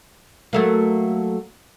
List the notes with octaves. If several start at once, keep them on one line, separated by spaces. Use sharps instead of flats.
F#3 A3 A#3